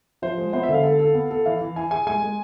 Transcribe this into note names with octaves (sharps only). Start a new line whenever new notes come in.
F3 C5
G#3
B3 C5
E5
D3
F5
A4
A4
B3
A4
E3 F5
E3
E4 G#5
G#4 G#5
G#3 G#5
G#3